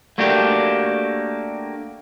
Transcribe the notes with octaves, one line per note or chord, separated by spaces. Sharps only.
A3 A#3 D4 F#4 G4